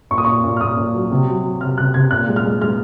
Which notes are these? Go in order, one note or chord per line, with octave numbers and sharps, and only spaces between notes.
A#2 C#6
D#6
A#2 C#6
A#2
F6
A#2 D#6
A#2
F#3
C3
F#3
F#3
C3 F6
C3 F#6
C3 G#6
A#2 F#6
G#3
F6
G#3
G#3 F6